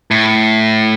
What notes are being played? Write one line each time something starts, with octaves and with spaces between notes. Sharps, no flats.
A2